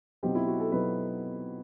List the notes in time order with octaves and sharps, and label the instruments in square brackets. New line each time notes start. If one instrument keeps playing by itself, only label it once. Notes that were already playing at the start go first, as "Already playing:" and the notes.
[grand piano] B2 F#3 C4 D#4 G4
E4
F#4
A4
B2 F#3 C4 D#4 B4